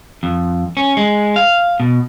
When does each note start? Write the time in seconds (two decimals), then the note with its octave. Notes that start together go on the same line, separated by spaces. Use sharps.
0.23 F2
0.77 C#4
0.97 G#3
1.36 F5
1.80 B2